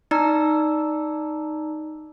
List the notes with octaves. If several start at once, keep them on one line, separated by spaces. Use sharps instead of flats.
D#4 D5 A#5 E6